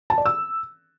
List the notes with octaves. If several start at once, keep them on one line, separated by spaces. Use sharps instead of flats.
A5
D5
E6